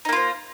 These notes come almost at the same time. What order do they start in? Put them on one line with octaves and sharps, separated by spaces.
D#4 A#3 F4 C5